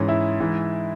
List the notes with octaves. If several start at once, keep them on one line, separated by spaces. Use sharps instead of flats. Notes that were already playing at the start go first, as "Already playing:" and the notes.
Already playing: G#2 E3 C#4
E4
G#2 E3